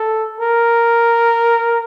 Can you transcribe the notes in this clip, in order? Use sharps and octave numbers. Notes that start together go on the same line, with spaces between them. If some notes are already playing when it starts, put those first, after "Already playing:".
Already playing: A4
A#4